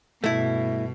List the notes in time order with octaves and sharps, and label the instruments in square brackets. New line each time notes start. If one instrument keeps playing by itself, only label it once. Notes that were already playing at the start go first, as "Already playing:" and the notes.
[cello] G2 B2 [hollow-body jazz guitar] A3 E4